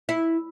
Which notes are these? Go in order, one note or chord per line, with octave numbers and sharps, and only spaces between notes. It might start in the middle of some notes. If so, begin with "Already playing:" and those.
E4